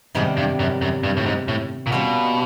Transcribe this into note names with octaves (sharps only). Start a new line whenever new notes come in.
G#2 C3 D#3 G3 B3 D4
G2
F#2
F#2
G2
A2
G#2
A2
A#2
B2 G3 A#3 C#4 F4